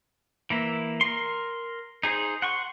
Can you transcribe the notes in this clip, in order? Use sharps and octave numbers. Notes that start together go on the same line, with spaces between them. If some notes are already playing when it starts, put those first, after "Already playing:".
E3 A#3 E5
A#4 C6
D#4 G#4 C5
F#5 C6 C#6